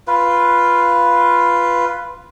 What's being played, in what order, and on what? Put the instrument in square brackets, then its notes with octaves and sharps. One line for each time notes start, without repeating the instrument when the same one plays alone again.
[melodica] F4 B4